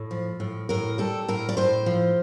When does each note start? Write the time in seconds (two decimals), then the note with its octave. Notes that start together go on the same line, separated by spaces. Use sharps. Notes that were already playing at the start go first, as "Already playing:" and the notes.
Already playing: A2
0.11 F3
0.40 A2
0.69 A2 A#4
0.98 G3 A4
1.28 A2 A#4
1.49 D5
1.57 A2 C5
1.86 F3